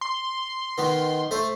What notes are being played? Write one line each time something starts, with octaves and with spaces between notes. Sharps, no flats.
C6
D#3 B3
A3 C5